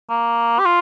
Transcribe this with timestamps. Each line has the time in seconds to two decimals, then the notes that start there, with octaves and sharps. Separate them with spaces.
0.10 A#3
0.60 G4
0.66 F4